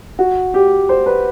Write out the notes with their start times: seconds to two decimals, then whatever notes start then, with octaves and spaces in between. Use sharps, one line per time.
0.19 F#4
0.54 G4
0.89 C5
1.06 B4